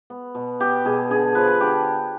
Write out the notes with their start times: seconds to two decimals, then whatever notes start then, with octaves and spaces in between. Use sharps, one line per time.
0.10 B3
0.35 B2
0.60 B3 G4
0.85 B2 G#4
1.10 D3 G#4
1.35 F3 B4
1.60 D3 G4